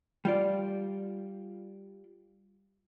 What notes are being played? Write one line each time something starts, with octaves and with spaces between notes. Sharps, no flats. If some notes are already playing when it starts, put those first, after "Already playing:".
G3 F4 D5